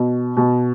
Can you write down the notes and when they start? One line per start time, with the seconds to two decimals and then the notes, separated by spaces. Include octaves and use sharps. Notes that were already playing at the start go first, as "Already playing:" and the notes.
Already playing: B2
0.37 B2